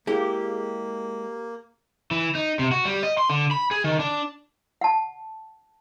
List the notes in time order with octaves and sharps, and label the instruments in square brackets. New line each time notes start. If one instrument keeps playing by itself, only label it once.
[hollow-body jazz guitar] G#3 E4 [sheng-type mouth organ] A#3 [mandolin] G4 [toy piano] G#4 F5
[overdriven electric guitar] E3
D#4
C3
F#4
G3
D#5
C6
D3
B5
G#4
D#3
D4
[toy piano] F#5 A5